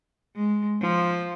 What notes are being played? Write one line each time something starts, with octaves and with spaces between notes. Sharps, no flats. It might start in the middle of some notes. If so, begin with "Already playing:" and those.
G#3
F3